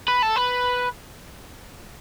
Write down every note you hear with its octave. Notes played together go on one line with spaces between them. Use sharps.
B4
A4
B4